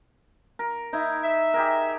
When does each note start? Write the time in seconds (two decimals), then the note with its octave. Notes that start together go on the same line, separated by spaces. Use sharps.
0.59 A#4
0.93 D#4 E4
1.23 E5
1.54 G4 G#4 A#4